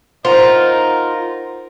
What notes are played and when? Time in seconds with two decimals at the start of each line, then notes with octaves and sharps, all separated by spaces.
0.25 D#4 F4 A#4 C5 F#5